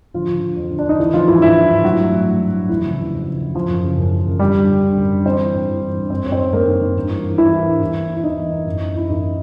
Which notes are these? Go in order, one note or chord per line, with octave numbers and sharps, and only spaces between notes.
D3 F3 F4
D3
D3
F2
D3
D4
F2 D#4
D#3 E3 E4
D#3 F3 F4
G2 E3 E4
G2 E3 E4
D#3
G2
A2 F#3 F#4
E3
A2
A2
A2
A2
F2 E3 E4
C#3
C#3
F2
C#3
F2
E3 F3 F4
F#2
C#3
F#2
E3
F#2
D3 G3 G4
D3
D3
D3
F#2
D3
E3 C4 C5
E3
G2
E3
E3
G2
F#2 C4 C5
F#2 C#5
C4 C5
D#3
F#2 A#3 A#4
D#3
D#3
G2
E3
E3
E3 E4
E3
G2
E2
E2
E3
E4
E2 D#4
E2
E2
F#2
E3
E3 E4
F#2 D#4